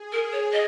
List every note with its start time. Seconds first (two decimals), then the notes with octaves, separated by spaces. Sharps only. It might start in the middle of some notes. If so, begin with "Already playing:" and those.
Already playing: G#4
0.12 A#4
0.32 C#5
0.52 D#5